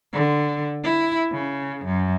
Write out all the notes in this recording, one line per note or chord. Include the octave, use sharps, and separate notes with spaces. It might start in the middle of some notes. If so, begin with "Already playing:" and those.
D3
E4
C#3
F#2